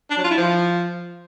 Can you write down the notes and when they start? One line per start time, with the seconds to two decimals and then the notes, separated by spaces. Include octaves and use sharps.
0.10 D4
0.17 F#3
0.24 F4
0.31 E4
0.37 F3